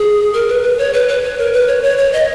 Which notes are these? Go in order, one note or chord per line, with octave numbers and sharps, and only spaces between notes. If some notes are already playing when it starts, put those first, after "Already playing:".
Already playing: G#4
A#4
B4
B4
C#5
B4
B4
C#5
A#4
B4
C#5
C#5
C#5
D#5